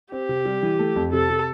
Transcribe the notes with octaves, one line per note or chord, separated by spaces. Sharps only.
C4 G4
C3
G3
E3
A3
F2
C3 A4
C3